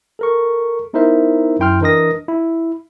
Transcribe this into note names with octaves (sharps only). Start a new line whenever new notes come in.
A4 A#4 C#6
B3 D#4 E4 A#4 C5 E5
F#2 E4 G5 C6 F6
E3 D4 A#4 D#5 D#6 A#6
E4